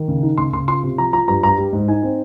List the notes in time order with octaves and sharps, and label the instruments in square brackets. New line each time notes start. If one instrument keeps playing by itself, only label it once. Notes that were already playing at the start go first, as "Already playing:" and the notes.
Already playing: [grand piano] D#3
C#3
D#4
C#3 C6
C#3 C6
F4 C6
C3
F3 A#5
F3 A#5
G2 A#5
G2 A#5
G3
G#2
D#4 G#5
C4